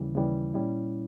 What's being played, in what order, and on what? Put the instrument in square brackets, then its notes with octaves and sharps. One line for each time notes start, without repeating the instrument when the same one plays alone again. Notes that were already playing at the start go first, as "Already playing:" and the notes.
Already playing: [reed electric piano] D#2 C#3 E3 G3
D#2 C#3 E3 G3
A#2 G3 C#4 E4